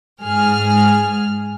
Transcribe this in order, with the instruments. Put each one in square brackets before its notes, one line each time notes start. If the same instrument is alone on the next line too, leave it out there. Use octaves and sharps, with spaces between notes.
[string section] G#2 G#4 F6